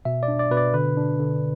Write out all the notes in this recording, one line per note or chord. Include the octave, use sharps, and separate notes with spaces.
B2 E5
D5
D4
D5
B2 B4
D5
D3 B4
D4
D3